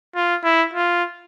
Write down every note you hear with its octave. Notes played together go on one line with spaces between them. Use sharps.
F4
E4
F4